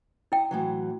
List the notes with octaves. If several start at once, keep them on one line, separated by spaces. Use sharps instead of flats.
E4 D#5 G5
A2 E3 F#3